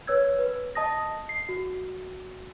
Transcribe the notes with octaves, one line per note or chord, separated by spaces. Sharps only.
B4 C#5 E6 G#6
B4
D#5 A5 D#6 A#6
C7
F#4